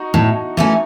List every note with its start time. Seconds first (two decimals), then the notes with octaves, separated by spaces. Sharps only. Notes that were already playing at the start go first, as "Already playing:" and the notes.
Already playing: D#4 F#4
0.14 A2
0.57 E3 A3 C#4